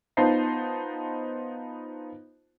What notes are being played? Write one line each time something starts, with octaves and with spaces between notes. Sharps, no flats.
B3 D#4 F4 C5 A5 C7